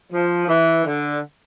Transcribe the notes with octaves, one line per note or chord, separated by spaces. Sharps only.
F3
E3
D3